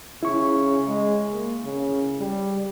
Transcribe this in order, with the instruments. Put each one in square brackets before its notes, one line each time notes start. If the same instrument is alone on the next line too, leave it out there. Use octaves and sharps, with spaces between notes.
[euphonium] C#3 [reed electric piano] E4 C#6
[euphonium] G#3
A#3
C#3
G3